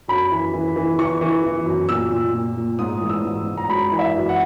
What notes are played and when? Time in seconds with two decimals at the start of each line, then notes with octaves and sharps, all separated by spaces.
0.08 F#2 B5
0.32 E3
0.54 E3
0.76 E3
0.99 E3 C#6
1.21 E3
1.43 E3
1.66 F#2
1.89 A#2 E6
2.11 A#2
2.34 A#2
2.57 A#2
2.79 G#2 D#6
3.01 E3
3.09 E6
3.23 G#2
3.46 G#2
3.58 A#5
3.69 F#2 B5
3.92 E3
3.99 E5
4.14 F#2
4.29 F#5